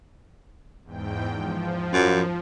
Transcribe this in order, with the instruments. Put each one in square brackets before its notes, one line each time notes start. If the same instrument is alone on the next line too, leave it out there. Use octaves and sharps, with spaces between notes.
[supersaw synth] E2 G#2 G5
F3
[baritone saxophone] F#2